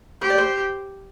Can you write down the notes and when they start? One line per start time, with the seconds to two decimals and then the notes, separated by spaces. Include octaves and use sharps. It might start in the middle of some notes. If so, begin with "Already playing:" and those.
0.21 G4 C5
0.30 D5
0.38 C5